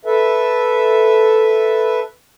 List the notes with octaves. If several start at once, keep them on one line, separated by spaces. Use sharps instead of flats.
A4 B4 E5